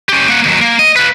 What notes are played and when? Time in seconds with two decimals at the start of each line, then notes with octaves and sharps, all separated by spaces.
0.09 C#4 G4
0.28 A#3 F#5
0.45 D#2 F#3
0.61 A#3
0.79 D#5
0.96 F4 B4